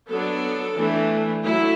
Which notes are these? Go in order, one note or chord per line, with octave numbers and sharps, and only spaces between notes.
F#3 B3 D4 A4
E3 A3 D4
F#3 A3 E4